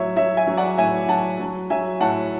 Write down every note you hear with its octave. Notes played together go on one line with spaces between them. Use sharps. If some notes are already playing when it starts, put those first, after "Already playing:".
Already playing: A2 F#3 C#5 E5
F#3 C#5 E5
E5 G#5
F#3
D5 F#5
A2 E5 G#5
F#3 F#5 A5
F#3
F#3 E5 G#5
A2 F#5 A5